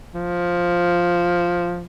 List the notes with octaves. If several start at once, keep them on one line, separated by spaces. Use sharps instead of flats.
F3